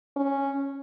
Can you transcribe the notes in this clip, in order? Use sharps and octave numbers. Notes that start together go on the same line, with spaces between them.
C#4